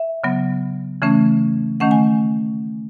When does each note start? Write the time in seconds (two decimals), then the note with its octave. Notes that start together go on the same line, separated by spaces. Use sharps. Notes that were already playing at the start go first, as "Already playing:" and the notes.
Already playing: E5
0.24 C#3 F#3 B3
1.02 C#3 E3 A3 C#4
1.80 D#3 A3 C#4 F#5
1.91 G#5